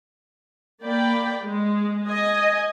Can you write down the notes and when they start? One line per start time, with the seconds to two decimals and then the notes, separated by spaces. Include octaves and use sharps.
0.83 A#3 D5 G5 B5
1.42 G#3
2.07 D#5 G#5